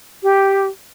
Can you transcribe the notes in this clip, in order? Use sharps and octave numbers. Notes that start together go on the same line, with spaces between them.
G4